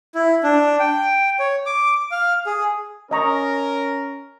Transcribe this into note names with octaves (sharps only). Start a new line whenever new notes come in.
E4
D4
G5
C#5
D6
F5
G#4
C#4 A#4 D#5 A#5 C#6